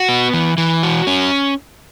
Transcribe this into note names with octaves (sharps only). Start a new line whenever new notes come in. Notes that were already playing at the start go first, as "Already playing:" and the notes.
Already playing: F#4
B3
E3
E3
F#4
C#4